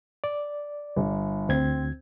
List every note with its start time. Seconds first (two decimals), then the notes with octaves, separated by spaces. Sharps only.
0.24 D5
0.96 G1
1.49 D2 C4 G#6